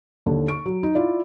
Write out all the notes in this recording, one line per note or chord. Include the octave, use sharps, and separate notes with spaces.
D#2 D3
C#6 D7
F#3
D#4
E4 F4 D5